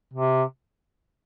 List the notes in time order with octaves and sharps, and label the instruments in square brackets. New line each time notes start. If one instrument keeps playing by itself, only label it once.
[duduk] C3